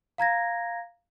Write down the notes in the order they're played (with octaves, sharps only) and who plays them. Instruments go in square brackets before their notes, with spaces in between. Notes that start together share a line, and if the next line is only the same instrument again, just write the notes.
[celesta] F5 A#5 G#6 A#6